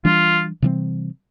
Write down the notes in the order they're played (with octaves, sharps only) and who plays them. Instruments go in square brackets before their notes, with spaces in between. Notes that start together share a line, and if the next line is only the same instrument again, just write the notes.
[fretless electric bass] E3 G3 D4 [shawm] F4
[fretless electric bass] C3 E3 G3 C4